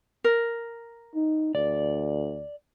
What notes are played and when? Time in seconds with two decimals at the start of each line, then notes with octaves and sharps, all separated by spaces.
0.24 A#4
1.15 D#4
1.55 D2 D5